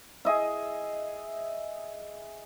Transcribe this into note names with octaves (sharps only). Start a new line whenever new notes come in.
G#4 D#5 E5